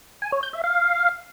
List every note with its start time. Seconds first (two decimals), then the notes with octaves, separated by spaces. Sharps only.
0.22 G#5
0.32 C#5
0.43 G6
0.53 E5
0.64 F5